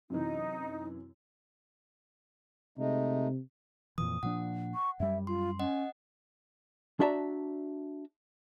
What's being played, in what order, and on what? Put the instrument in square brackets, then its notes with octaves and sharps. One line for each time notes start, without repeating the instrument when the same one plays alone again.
[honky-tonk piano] F#2 C3 E3 [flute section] D#4
[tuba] C3 [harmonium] G#3 A3 D#4
[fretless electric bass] F2 A#2 E3 [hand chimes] D#6
[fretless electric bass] A#2 F3 D4 [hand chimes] F#5
[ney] C#6
[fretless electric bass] F#2 G3 [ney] E5
[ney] F4 [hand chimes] C6
[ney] C#4 [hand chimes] D#5 F#5
[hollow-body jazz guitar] D4 F#4 D5 E5 A5 A#5